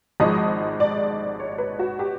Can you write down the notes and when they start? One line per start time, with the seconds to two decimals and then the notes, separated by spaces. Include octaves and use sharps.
0.20 G#1 G#2 F3 G#3 D#5
0.80 D5
1.40 C#5
1.58 B4
1.79 F#4
1.99 G4